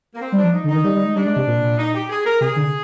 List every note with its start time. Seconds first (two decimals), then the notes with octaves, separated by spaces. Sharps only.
0.14 A#3
0.21 C4
0.32 G3
0.38 D4
0.43 F3
0.53 D#4
0.64 D3
0.68 D#4
0.74 D#3
0.84 G3
0.94 G3
1.05 G#3
1.16 G3 D4
1.26 G#3
1.36 C3
1.47 A#2
1.78 D#4
1.94 G4
2.10 G#4
2.25 A#4
2.41 C3 G#4
2.56 D3